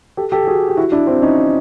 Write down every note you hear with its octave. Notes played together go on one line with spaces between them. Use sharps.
G4 A4
G4 A4
F#4 G#4
G4
E4 F#4
D4 E4
C4 D4
C#4 D#4